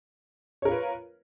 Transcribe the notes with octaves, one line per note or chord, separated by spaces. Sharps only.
F4 A#4 B4 C#5